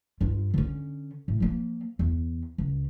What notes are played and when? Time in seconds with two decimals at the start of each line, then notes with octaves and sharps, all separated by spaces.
0.21 G2 F4
0.54 D3 C#4
1.28 A2
1.40 F3 A#3
1.99 E2
2.58 C#2